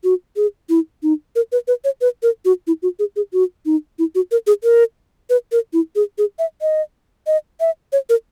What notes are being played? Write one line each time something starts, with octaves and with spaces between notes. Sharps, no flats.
F#4
G#4
E4
D#4
A#4
B4
B4
C#5
B4
A#4
F#4
E4
F#4
G#4
G#4
F#4
D#4
E4
F#4
A#4
G#4
A#4
B4
A#4
E4
G#4
G#4
E5
D#5
D#5
E5
C#5
A#4